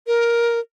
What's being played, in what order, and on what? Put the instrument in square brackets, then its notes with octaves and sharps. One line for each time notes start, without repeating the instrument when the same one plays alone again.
[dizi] A#4